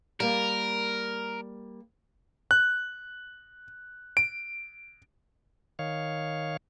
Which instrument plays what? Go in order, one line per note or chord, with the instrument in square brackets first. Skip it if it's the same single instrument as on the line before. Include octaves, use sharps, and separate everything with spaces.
[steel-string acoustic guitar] G3 A#3 [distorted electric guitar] A#4
[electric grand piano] F#6
D7
[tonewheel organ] D#3 C#5 F5